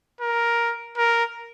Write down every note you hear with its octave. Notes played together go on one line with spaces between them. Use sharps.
A#4
A#4